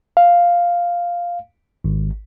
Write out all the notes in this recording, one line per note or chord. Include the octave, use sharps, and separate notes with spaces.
F5
G#1